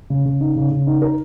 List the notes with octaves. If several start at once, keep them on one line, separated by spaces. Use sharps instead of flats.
C#3
C#3
D#4
C#3
C#3
D#4
A#4